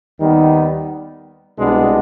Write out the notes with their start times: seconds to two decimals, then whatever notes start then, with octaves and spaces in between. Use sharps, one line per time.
0.20 D#2 D#3 G3 B3 D#4
1.58 C2 B2 G#3 B3 D4